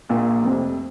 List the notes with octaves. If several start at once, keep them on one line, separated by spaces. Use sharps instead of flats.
A#1 A#2 A#3
F1 F2 C3